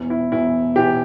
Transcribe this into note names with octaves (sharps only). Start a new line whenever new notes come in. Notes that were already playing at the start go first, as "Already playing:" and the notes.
Already playing: E1 E2 E3
E4
E1 E2 E3 E4
E1 E2 E3 G4